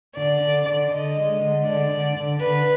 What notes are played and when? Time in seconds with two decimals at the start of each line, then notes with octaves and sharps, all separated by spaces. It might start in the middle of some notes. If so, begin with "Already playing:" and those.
0.17 D3 D5
0.41 D3
0.67 D3
0.91 D3 D#5
1.17 G#3
1.41 D3
1.65 D3 D5
1.90 D3
2.16 D3
2.40 D3 B4